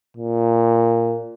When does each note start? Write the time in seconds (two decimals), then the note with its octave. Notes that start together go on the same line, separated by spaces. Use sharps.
0.17 A#2